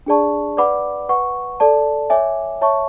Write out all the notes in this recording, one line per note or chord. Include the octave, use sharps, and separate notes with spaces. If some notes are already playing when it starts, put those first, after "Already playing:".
D4 G#4 D5 A5 C#6
B4 D5 F#5 B5 D6
B4 F#5 C#6
A4 D5 A5
C#5 E5 G#5 D6
C#5 E5 A5 C#6